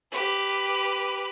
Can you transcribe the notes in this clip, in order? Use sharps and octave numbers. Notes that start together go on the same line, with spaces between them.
G4 B4